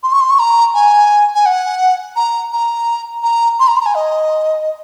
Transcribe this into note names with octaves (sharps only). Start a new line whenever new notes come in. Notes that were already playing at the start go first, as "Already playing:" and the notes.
C6
C#6
C6
C#6
A#5
G#5
G#5
F#5
A#5
A#5
A#5
C6
A#5
C6
A#5
G#5
D#5